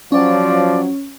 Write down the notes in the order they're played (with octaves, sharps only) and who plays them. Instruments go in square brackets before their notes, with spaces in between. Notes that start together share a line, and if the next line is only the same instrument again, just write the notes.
[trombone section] F3 F#3 [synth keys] C#4 [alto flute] D5